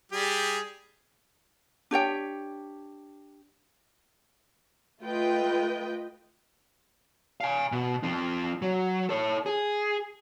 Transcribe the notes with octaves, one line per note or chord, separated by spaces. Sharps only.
G3 G4 G#4
D4 G4 C#5 G5
A3 F4 B4 D#5 G5
F5 G#5
B2
F3 C4
F#3
A4 C#5
G#4